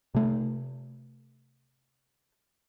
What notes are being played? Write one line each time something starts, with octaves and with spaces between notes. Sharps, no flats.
C3 A3